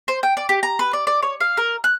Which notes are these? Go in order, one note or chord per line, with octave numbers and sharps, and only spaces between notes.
C5
G5
D5
G4
A#5
B4
D5
D5
C#5
F5
A#4
F#6